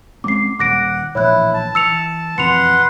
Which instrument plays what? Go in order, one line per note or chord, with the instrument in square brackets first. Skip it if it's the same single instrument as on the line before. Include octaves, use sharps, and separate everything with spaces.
[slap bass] G#3 C4 C#4 [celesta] D6 C7
[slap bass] D#1 [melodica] F#5 [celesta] D6 A#6 D7
[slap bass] A#1 A2 E3 [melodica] E4 [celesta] C#5 F#6
[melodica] A5
[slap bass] E3 [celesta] E6 C#7 F7
[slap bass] F2 B2 E3 [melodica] B4 F#5 C6 [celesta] C#7 F7